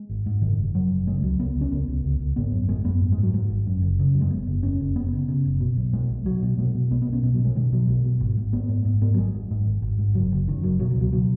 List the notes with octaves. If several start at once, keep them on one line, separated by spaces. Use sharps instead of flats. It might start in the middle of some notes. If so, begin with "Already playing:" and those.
Already playing: G#3
G#1
G#2
F#1 D#3
F#1
F#1 F#3
F#1
C#3 G#3
C#2 F#3
C#2 B3
C#2
C#4
C#2 B3
C#2
C#2
C#2
G#1 B3
F#2
G#1 G#3
F#2 B3
G#2
G#3
G#2 F#3
G#2 G#3
G#1
F#2
F#1
C#3
F#2
G#3
F#1 B3
F#1
F#1 C#4
F#1
F#1 B3
C#3
C#3
F#1
B2
B1
B2 G#3
B1
B1 F#3
B2
B2 G#3
B2
B1 B3
B3
B1
C#4
B2 B3
F#3
B2
G#3
B2 D#3
B2 F#3
B1 G#3
B2
G#1
G#2
G#1 B3
G#2
G#2
G#2 B3
F#3
G#1 G#3
G#2
G#2
G#1
G#1
G#2
F#1 F#3
F#1
F#2 D#3
F#1 F#3
B2 F#3
F#3
C#2
F#3
B2 F#3